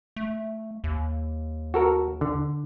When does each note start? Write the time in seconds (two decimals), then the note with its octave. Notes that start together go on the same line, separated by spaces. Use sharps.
0.16 A3
0.84 D#2
1.74 F#4 A4 A#4
2.21 D3